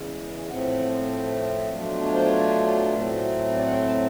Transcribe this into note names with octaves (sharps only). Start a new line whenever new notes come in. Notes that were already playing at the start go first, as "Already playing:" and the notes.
Already playing: E2 C#3 E3 G#3
A2 F3 A3 C4 F#5
B2 F#3 A3 D4 F4
C#5
C5
C#5
A2 F#3 A3 C4
D5
F#5
G5
A5